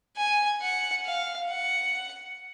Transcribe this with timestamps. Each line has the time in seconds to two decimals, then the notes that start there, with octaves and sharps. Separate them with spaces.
0.17 G#5
0.62 F#5
1.05 F5
1.49 F#5